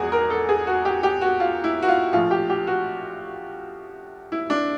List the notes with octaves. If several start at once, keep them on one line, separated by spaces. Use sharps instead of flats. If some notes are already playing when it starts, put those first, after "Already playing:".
Already playing: E1 E2 F3 F#4 G#4
A#4
A4
G#4
F#4
G4
G4
F#4
F4
E4
F#4
F4
A#1 A2 F3 F4
G4
G4
F#4
E4
D4